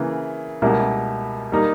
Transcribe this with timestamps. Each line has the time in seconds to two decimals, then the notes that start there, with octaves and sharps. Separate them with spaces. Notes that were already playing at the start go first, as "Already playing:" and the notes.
Already playing: C#3 E3 A#3
0.62 C#2 B2 G3 A#3 E4
1.52 G3 A#3 D#4